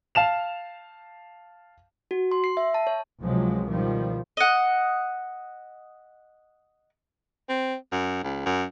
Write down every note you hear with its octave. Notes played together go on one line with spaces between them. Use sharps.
F5 A5 E7 F7
F#4
C6
C7
E5
A5
C#5
C#2 C3 F3 F#3 G#3
B2 D#3 F3 G3
D#5 F#5
C4
F#2
C#2
F#2